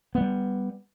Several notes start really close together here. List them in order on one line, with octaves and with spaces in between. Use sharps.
B3 G#3 G3